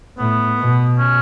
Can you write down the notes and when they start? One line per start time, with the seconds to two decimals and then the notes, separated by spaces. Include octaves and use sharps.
0.18 A2 B3
0.59 B2
0.98 C#4